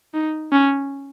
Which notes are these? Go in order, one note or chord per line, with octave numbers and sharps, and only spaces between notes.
D#4
C#4